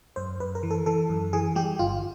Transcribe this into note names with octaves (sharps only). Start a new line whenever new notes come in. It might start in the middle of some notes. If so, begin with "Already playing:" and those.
F#2 C5
F#2 B4
A#4
E3
A4
E3 A4
F#2
E3 G#4
G3 G4
G1 F4